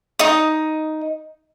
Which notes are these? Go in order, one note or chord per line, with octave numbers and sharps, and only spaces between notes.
D#4 D#5 D#6